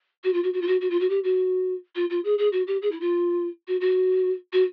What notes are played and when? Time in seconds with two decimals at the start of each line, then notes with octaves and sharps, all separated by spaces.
0.24 F#4
0.33 F4
0.43 F#4
0.53 F#4
0.61 F4
0.67 F#4
0.81 F#4
0.90 F4
1.00 F#4
1.09 G4
1.24 F#4
1.95 F4
2.10 F4
2.24 G#4
2.38 G#4
2.52 F#4
2.67 G4
2.82 G#4
2.91 E4
3.00 F4
3.67 F#4
3.80 F#4
4.52 F#4